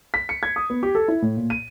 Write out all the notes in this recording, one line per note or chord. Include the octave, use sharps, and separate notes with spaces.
B6
C#7
G#6
D#6
B3
G4
A4
E4
A2
A#2
D#7